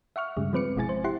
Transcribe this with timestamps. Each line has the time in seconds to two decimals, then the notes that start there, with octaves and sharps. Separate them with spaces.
0.16 E5 F#5 C#6 F6
0.37 G2 C#3 G3 G#3
0.53 F3 G#3 C4 B4 D6 C#7
0.76 G1 B2 G#3 E4 G#5 A6
0.89 C5
1.04 E4 G4 F#5 C6